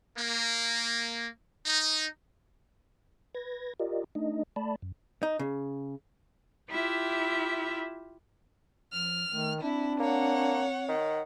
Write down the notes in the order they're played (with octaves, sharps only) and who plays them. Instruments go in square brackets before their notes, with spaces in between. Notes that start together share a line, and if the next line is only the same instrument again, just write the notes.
[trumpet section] A#3
D#4
[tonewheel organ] B4 G#6 A#6
F4 G4 A#4 D5 D#5
A3 D4 D#4 D#5
A3 D5 A5 B5
F#2
[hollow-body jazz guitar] D#4
C#3
[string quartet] E4 F4 G4 E5
[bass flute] F3 [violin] F6
[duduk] D#3 [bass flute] A3
[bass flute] C4 [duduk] D4 [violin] E4
[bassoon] A#3 [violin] C#5 F#5
[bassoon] D#3